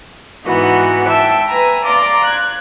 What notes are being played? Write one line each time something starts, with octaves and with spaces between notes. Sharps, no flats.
G#2 E3 B3 D#4 F#4
E5 G5 A5 E6
B4 G#5 A#5
D5 F5 A#5 C6 D6
F#6 G#6